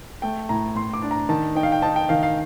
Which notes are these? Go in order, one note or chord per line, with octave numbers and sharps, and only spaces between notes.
A3 G5
A2 A#5
A2 C6
D6
D4
A#5
D#3 A5
D#4 G5
F5
G5
D#4 A5
G5
D#3 F5
F5